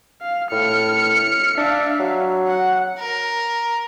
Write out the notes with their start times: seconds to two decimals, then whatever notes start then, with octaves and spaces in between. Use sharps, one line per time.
0.22 F5
0.51 A2 F6 C#7
1.58 D4 E5 F5
2.00 F#3
2.47 F#5
2.99 A#4